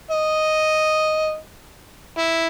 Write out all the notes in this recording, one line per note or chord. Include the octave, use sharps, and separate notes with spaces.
D#5
E4